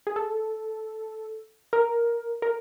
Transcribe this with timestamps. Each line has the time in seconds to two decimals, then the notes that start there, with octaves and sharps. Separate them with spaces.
0.07 G#4
0.16 A4
1.73 A#4
2.42 A#4